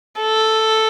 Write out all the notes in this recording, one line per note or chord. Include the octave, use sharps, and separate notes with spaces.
A4